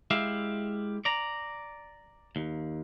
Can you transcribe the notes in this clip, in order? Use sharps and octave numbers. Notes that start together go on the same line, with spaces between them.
G#3 E4 G4 E5 F5
D5 A#5
D#2